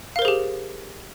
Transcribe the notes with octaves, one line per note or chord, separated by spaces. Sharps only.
G4 G#4 A#4 C5 F5